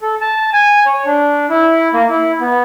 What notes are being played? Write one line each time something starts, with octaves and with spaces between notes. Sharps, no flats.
A4
A5
G#5
C#5
D4
E4
A#3
E4
B3